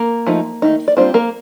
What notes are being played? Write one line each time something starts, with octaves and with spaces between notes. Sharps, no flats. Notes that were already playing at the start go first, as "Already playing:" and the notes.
Already playing: A#3 A#4
F3 A3 D#4
D#3 A3 D#4
D5
G3 A#3 C4 D4 F4 C5
A#3 A#4